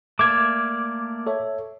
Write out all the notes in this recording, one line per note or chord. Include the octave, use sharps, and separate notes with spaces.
A3 A#3 D5 D6 G#6
A4 C#5 E5